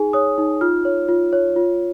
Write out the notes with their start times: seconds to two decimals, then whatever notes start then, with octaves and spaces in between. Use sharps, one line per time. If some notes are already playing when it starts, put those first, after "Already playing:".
Already playing: D#4 G#4 G#5
0.13 C#5 D#6
0.38 D#4
0.61 F4 F6
0.85 C#5
1.09 F4
1.33 C#5
1.56 F4